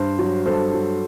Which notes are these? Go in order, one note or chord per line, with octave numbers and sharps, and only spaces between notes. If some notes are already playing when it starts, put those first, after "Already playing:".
Already playing: G2 C5
F#3
G2 A4 C5
F#3